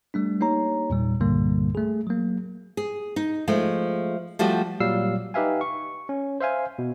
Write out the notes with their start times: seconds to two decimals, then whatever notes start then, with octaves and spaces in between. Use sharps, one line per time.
0.14 G3 A3 D4
0.41 A#3 D#4 G4 C#5 A#5
0.90 E2 A#2 G3
1.20 C2 G2 A#2 D3 G3 A#3
1.75 A3 G#4
2.07 F#3 A#3
2.77 G#4
3.16 D#4
3.48 F3 G#3 A3
4.39 F3 G3 A3 F#4
4.80 A#2 F#3 G3 F5 E6 C7
5.34 D#4 G4 B4 E5 F5 G#5
5.61 C#6
6.09 C#4
6.40 C5 E5 F5 G#5
6.79 B2